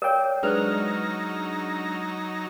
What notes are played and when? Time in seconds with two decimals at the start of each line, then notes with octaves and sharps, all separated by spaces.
0.02 A#4 C#5 D5 F5 G5
0.43 F#3 G#3 D4 D#4 B4 C5 A#5 F6